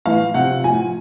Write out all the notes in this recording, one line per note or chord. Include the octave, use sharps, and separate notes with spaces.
A2 E3 F5
C3 F3 F#5
A2 F3 G#5